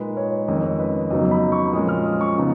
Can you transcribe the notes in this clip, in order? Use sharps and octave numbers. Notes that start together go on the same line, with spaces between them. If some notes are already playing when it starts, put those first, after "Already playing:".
Already playing: A#2 G#3 D#4 B4
C#5
F2 D#3 G#3 C#4 D#5
B4
F2 C#3 F#3 B3 D#4 D#5
B5
C#6
A#2 F3 G#3 C#4 D#6
F6
D#6
C#6
C#3 F3 B3 D#4